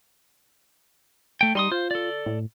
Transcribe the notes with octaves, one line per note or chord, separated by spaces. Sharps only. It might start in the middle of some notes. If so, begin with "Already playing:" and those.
A3 G5
G3 D#4 C6 D#6
F4 C5
A4 D5
A2